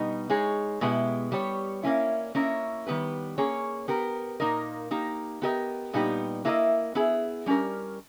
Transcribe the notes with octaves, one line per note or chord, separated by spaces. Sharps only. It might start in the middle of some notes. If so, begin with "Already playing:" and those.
Already playing: B2 G3 B3 D#4
G#3 D#4 G#4 C#5
B2 G#3 B3 E4 G4
G3 B3 G4 C#5
A#3 C#4 E4
A#3 C#4 E4 A#4 D#5
D#3 G3 B3 G4 B4
A#3 C#4 G#4 C#5
B3 G4 A#4
A#2 A#3 D#4 A#4 D#5
A#3 D#4 G4
B3 G4 A#4 D#5
A#2 G3 B3 D#4 G4
A#3 E4 A#4 D#5
B3 E4 G#4
G3 C#4 G4 A#4